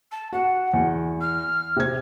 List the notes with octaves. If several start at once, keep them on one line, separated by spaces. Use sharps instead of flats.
A5
F#4 F#5
E2
F6
C3 G#6